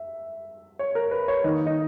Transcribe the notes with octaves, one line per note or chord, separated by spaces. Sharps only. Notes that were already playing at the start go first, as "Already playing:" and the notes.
Already playing: E5
C#5
A#4
B4
C#5
D#3 A#3 D#4
D#4